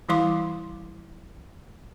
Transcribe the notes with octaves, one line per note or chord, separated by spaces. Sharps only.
E3 G3 E4 F5 C6 D6